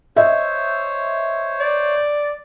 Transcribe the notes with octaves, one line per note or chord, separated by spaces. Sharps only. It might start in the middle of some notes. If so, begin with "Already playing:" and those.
C5 C#5 D#5 E5
D5